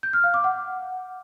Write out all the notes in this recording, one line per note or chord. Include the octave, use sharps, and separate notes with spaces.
G6
F6
F5
D6
F#5